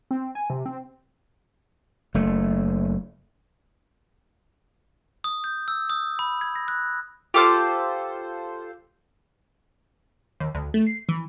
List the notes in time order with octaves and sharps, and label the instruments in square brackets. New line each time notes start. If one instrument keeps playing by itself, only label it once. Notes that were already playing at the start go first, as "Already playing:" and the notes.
[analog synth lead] C4
G#5
C3
C4
[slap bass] F#1 A3
[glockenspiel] D#6
G6
E6
D#6
B5
G#6
A#6
F#6
[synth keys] F4 A4 C5 [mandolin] G4 D6 F6
[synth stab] D#2
D2
A3
C7
E3